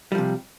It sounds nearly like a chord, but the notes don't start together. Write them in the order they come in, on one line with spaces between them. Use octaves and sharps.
G3 F3 C3